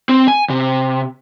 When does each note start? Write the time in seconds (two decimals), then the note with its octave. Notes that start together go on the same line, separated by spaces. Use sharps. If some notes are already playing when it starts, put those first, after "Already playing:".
0.09 C4
0.28 G#5
0.50 C3